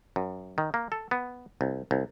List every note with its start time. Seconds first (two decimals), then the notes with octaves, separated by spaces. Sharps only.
0.16 F#2
0.58 D#3
0.74 A#3
0.92 A4
1.11 B3
1.61 C2
1.91 C2